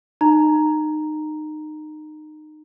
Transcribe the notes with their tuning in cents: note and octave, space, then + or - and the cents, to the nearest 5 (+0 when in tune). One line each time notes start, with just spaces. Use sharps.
D#4 -25 A#5 +0